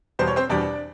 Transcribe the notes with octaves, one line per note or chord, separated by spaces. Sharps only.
E2 B2 G3 C5
C#5
C4 C5
E2 B2 G3 D4 D5